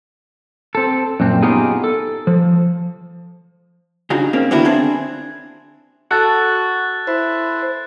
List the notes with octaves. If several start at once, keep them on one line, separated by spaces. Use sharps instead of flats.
C4 A4
F#2 A#2 C4
B3 D#4 F4 G4 G#4 G#5
A4
F3
C#3 D4 D#4 F#4
A#3 C4 C#4
D3 D#3 B3 D4 E4 F#4
C4 D4 G#4
F#4 A4 F#6 A6
E4 C5